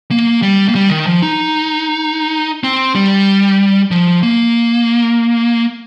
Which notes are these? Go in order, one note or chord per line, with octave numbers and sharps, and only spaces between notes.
A#3
G3
A#3
G3
D#3
F3
D#4
C4
G3
F3
A#3